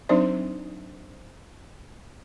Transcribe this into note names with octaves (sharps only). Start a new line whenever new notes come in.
F#3 C4 D4 D#4 C5 D5